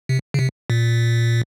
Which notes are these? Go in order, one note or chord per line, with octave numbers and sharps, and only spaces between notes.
C3
C#3
C3
A#2